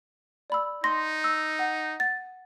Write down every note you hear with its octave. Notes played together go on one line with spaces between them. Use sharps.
D5 B5 E6
D#4 C6 A#6
E6
F#5
F#5 A6